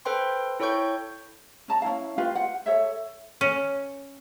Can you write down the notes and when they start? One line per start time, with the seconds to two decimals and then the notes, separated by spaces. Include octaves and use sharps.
0.05 A4 B4 C5 G5 C6
0.60 E4 A4 C#5 G5 C#6 G6
1.68 C#4 A5 A#5
1.82 C#4 E4 F5
2.18 F4 G4 B4 F5
2.35 F#5
2.66 A4 C#5 E5
3.41 C#4